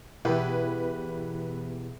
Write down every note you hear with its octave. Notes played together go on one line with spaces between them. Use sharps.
E2 B2 E3 B3 E4 G4 B4